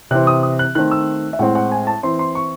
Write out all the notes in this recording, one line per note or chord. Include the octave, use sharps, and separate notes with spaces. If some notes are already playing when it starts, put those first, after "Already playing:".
C3 E3 C4 F#6
D#6
D#6
F#6
D#3 A3 C4 F#6
E6
E5
A2 G#3 C4 F#5
F#5
G#5
A5
E3 C4 C6
C6
C#6